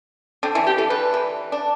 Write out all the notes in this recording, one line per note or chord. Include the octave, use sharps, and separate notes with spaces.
D3 C4
E3 E4
F3 G4
E3 A4
D3 B4
E3
D4